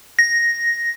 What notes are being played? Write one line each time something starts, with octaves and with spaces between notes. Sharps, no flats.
A#6